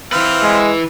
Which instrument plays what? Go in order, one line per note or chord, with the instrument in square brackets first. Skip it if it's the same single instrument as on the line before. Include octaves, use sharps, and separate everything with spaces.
[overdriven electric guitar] E3 B4 [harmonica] C4 F5
[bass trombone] G#3